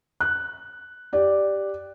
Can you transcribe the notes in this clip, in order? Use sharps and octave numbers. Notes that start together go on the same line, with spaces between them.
F#6
G4 D5